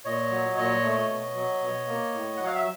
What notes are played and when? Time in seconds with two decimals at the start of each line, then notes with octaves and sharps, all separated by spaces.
0.05 A#2 C#5 D#5
0.31 F#3
0.57 A#2 C#5 D#5
0.83 A3
1.09 B2
1.35 F#3
1.62 B2
1.87 A#3
2.14 A2
2.37 F#3 F#5
2.46 F5
2.55 E5